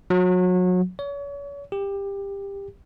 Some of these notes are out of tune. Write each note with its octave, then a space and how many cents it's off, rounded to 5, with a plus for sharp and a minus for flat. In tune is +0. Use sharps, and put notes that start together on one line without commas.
F#3 -30
C#5 +35
G4 +20